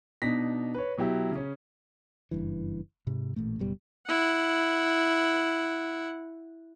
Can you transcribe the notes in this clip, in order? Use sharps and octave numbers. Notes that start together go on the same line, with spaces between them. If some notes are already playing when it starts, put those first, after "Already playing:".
B2 D4 D#4 A#6 B6
B4 C#5
B2 F#3 E4 G4
C#3 C#4
F#1 G2 E3
G#2 C3
A1 A#2 A3
F#1 B2 G3
E4 F#5